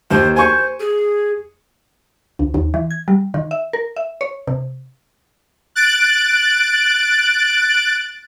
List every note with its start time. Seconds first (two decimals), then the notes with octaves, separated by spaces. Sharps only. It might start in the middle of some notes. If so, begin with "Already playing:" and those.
0.11 D#2 C5
0.36 C5 G#5 C#6
0.80 G#4
2.39 D2
2.54 D#2
2.74 E3
2.91 G#6
3.08 G3
3.34 D#3
3.51 E5
3.73 A#4
3.96 E5
4.21 C#5
4.47 C3
5.75 F#6 A6 D7